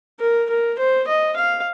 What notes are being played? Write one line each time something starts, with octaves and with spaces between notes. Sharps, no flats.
A#4
A#4
C5
D#5
F5